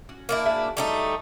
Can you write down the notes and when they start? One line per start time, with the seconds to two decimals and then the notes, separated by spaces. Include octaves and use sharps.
0.09 C#4 F#4
0.29 A#3 D4 E4
0.46 F#4 G#4 E5
0.77 G3 A3 D#4